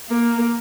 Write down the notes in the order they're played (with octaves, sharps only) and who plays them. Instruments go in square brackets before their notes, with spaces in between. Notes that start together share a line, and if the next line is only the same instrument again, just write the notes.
[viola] A#3